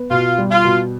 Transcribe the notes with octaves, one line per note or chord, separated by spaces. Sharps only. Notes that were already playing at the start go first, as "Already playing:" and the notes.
Already playing: B3
B2 F4
G3
F4
B2